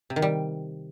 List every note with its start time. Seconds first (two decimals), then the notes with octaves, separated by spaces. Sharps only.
0.10 C3
0.16 D#3
0.22 G3